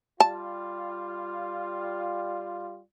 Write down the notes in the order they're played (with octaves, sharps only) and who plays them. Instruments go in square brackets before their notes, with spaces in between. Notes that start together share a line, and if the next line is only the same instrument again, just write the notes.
[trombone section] G3 F4 [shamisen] A5